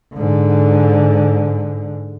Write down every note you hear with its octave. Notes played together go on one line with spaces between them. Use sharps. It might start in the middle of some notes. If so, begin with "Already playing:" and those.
G#2 D3